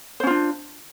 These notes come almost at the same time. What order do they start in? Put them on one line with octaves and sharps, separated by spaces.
C5 C#4 F4 D4